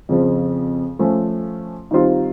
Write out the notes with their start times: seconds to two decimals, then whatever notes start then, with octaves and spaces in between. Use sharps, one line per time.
0.09 F2 C#3 F3
0.99 F3 A3 C#4 F4
1.91 D#3 G3 C4 F4